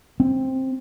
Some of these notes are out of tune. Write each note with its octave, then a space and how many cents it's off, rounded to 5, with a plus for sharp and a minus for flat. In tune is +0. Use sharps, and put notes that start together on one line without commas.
C4 +10